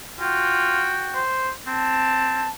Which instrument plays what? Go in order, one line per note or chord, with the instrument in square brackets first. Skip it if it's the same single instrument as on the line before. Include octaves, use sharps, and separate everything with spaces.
[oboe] F4 [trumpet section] F#4 G5
[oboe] C5
[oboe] C4 [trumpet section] A5